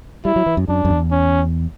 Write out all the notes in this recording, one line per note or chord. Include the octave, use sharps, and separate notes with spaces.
G3 E4
F#3
E3
F#2
F#2 D4
F#2
E2
C#4